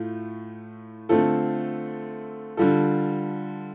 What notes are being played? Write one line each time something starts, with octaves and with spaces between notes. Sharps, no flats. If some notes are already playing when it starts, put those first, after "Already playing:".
Already playing: A2 A3 F4
D3 A3 C4 F4 A4
D3 G3 F4 A4